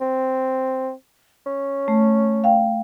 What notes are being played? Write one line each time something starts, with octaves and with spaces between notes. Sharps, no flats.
C4
C#4
A3
F5 G5